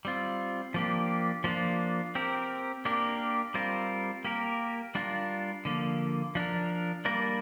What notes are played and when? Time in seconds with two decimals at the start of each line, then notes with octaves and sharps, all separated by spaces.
0.05 G3 C4 F4
0.74 F3 A#3 D4 G4
1.44 F3 A#3 D4 F4
2.15 C4 G4 A#4
2.85 A#3 D4 G4 A#4
3.54 G3 C4 F4 A#4
4.25 A#3 G4 A#4
4.95 G3 D4 F4 A#4
5.65 D3 F3 A#3
6.35 F3 D4 A#4
7.05 G3 A#3 D4 A#4